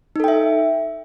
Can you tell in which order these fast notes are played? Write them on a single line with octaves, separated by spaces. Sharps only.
D#4 A4 G5 E5